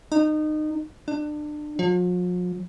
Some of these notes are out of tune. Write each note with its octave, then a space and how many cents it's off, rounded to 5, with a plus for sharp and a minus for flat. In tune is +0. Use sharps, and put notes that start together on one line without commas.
D#4 -25
D4 +30
F3 +45